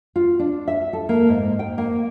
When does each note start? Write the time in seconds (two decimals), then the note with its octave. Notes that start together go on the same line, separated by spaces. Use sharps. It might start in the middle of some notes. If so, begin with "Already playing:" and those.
0.16 F4
0.39 D4
0.68 E5
0.93 A4
1.09 A#3
1.29 G#2
1.59 G5
1.78 A#3